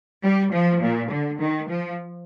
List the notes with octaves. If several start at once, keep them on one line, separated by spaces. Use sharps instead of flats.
G3
F3
A#2
D3
D#3
F3